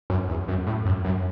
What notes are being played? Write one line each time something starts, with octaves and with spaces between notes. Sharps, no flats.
F#2
E2
F#2
A2
F#2
F#2